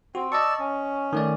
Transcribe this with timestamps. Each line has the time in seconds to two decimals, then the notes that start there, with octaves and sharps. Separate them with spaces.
0.15 C4 F#4
0.32 D5 D#5 A5 C#6 E6
0.59 C#4
1.13 D#3 A3 D5